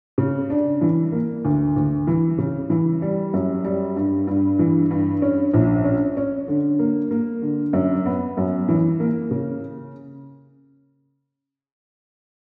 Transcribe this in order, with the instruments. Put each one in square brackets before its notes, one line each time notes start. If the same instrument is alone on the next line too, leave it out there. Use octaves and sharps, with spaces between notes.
[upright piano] C#3
D4
E3
A#3
D2
D2
E3
C#3
E3
G3
F#2
G3
G2
G2
E3
G2
C#4
A#1
C#4
C#4
D3
A#3
A#3
D3
F#2
B3
F#2
E3
A#3
C#3